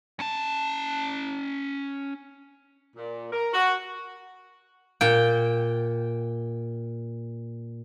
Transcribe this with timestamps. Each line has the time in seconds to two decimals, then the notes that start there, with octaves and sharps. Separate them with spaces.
0.20 C#4 A5
2.97 A#2
3.33 A#4
3.54 F#4
5.01 A#2 G5